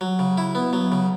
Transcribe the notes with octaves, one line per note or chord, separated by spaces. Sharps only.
F#3
C#3
E4
B3
F#3
C#3